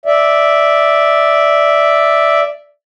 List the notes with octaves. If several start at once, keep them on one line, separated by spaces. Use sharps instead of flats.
D5 E5